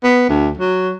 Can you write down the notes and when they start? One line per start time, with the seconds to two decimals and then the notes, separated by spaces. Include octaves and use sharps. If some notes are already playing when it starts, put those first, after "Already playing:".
0.04 B3
0.29 D2
0.57 F#3